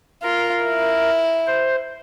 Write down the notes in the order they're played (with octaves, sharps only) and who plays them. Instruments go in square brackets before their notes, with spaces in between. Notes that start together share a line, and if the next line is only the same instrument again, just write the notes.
[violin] F4 [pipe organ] A#4
[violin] E4
[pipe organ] C5